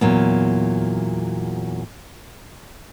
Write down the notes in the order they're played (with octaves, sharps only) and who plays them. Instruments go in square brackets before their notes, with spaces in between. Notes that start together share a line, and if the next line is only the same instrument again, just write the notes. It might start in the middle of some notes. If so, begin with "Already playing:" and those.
[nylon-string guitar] E2 A#2 F#3